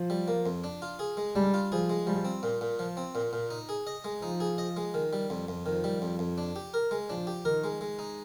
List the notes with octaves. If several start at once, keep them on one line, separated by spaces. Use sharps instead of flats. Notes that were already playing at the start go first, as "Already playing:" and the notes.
Already playing: F3
G3
A#3
F2
D4
F4
G#4
G#3
G3 D4
F4
F3 G#4
G#3
F3 G3
C4
A#2
A#2
F3
C4
A#2
A#2
D#4
G#4
D#5
G#3
F3 D#4
G#4
D#5
G#3
D#3
G3
F2
F2
D#3 F3
G3
F2
F2
D4
G4
A#4
G#3
F3 D4
G4
D#3 A#4
G#3
G#3
D#4